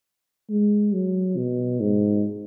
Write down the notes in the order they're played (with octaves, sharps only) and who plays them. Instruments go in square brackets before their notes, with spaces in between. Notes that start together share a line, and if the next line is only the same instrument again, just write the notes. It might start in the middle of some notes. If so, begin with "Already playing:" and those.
[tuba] G#3
F#3
B2
G#2